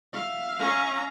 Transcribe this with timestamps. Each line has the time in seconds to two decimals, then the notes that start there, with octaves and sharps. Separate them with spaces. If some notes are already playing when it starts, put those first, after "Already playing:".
0.13 E5 F5
0.58 C#4 A#5